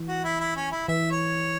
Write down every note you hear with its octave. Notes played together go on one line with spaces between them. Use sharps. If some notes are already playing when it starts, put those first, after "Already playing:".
Already playing: E3
F#4
E4
E4
C#4
E4
E3 E5
C#5